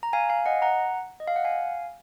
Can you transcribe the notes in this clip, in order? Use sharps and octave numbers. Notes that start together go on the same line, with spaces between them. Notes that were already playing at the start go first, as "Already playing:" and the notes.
A#5
F5 G#5
F5 G#5
D#5 F#5
F#5 A#5
D#5
F5
F#5
F5 G#5